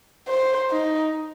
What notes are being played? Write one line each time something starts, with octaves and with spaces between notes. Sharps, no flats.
C5
D#4